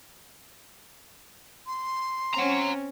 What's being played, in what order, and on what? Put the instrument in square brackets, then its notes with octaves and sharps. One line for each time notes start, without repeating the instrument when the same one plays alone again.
[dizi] C6
[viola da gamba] C4 C#4 [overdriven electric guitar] F#5 A#5